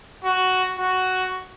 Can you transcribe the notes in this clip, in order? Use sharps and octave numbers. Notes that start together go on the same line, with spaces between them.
F#4
F#4